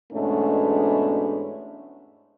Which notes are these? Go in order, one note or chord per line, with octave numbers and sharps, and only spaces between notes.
E2 G#2 B2 A3 C#4 D4